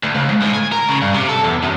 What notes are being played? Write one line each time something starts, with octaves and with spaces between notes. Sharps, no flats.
D2
C#2
G#2
A2
G#5
A#4
C#3
G2
C3
A4
E2
F#2